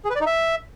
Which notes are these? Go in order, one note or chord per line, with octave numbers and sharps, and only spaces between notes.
G#4
B4
D5
D#4
E5